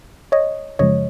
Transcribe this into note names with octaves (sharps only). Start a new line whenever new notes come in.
C#5 D#5
F#2 C#3 F3 G#3 C#5 D#5